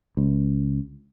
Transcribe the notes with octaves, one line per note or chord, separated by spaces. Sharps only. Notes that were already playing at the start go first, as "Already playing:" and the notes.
C#2